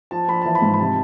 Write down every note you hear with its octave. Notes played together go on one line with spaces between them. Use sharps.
F3 A5
F3 B5
E3 A5
B5
G#2
B5
C3 A5